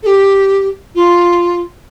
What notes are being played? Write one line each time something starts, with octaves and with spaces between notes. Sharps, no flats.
A4
G4
F4